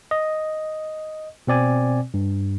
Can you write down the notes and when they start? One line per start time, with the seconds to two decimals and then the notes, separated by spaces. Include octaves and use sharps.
0.11 D#5
1.47 B2 C4 D5 G#5
2.14 G2